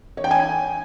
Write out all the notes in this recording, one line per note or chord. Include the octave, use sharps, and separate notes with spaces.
C#5
G5
G#5